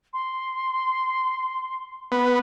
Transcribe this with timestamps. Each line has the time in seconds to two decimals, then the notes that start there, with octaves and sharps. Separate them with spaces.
0.13 C6
2.12 B3